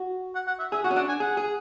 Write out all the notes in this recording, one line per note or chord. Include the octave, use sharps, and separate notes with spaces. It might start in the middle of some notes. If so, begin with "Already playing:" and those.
Already playing: F#4
F#5
F#5
E5
G#4 E5
F#4 F#5
C#4
D4 F#5
G#5
G#4 F#5
G#4